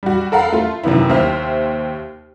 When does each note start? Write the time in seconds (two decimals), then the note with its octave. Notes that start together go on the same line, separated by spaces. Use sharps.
0.03 G3 F#4
0.32 A4 A#4 F5 F#5 A#5 B5
0.52 A3 F4
0.83 F#2 C3 D#3 B3 E4
1.10 D#2 C5 E5 F6